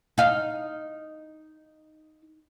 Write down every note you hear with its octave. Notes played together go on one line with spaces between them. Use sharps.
D#4 F5